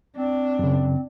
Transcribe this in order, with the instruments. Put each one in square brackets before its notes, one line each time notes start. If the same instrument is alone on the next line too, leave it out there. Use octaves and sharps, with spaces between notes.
[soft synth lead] C4 [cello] D4
[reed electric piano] F#2 C#3